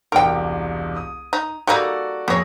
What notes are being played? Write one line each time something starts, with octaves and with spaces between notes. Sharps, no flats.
E1 C2 A#4 G5 D7
D#6
D#4
G3 A#3 D#4 F#4 A4 D5
F2 A#3 G#4 C#5 A#6